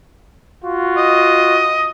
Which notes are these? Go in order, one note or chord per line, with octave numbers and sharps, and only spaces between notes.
F4 F#4
D#5